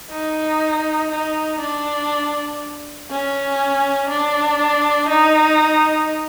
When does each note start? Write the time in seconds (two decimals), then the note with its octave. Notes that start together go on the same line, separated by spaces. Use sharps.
0.11 D#4
1.11 D#4
1.60 D4
3.11 C#4
4.10 D4
5.09 D#4